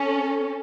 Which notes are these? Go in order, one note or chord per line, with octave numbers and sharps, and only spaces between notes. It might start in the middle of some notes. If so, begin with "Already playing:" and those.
Already playing: C#4 A4